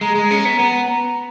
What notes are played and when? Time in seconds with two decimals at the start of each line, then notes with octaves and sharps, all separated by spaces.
0.01 G#3 A#5
0.15 G#3
0.31 C#4
0.45 B3
0.59 B3